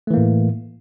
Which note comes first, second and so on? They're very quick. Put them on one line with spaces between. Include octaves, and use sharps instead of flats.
A3 E3 A#3 A2